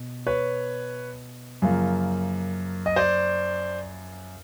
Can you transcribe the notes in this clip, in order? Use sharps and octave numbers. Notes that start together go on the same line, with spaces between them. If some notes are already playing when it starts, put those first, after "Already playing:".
Already playing: B2
B4 C#5
F#2 C#3 F3 A#3
D#5
C5 D5